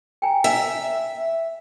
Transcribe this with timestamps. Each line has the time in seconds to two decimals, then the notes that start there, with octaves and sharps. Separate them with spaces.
0.22 G5 G#5 A#5
0.44 E5